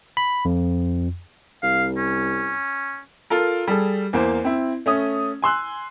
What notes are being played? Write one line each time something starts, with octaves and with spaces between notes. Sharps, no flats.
B5
F2
C2 F5
C#4
F4 A4 A#4
G3 G#4 A4
E2 A#3 C5
C4 E4
A3 C#4 D#6
G#5 C6 E6 F#6